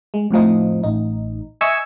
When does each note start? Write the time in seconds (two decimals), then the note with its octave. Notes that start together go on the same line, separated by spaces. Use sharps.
0.14 G#3
0.31 F2 A2 F3 D#4
0.83 A1 D#4
1.61 D#5 E5 G#5 C#6 E6